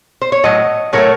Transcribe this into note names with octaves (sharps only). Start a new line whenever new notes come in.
C5
C#5
A2 F#3 D#5
A2 F#3 A3 A#4 C#5